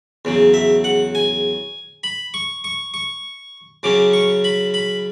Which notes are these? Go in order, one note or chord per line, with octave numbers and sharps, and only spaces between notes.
E2 C#3 F#3
E5
F#5
G#5
B5
C#6
C#6
C#6
F#2 C#3 F#3 C#4 D6
C#6
B5
B5